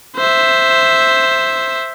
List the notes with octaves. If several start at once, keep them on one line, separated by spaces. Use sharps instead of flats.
C5 E5